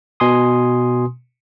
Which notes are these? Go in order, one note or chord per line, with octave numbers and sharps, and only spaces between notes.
B2 G#5 C6 D#6